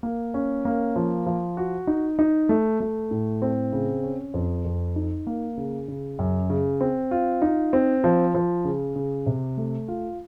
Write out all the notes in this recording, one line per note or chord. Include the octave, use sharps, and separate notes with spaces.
A#3
C#4
A#3
F3
F3
F#4
D#4
D#4
A3
A3
A2
C4
C#3
C#4
F2
F2
D#4
A#3
C#3
C#3
F#2
C#3
C4
F4
D#4
C4
F3
F3
C#3
C#3
C3
A3
F4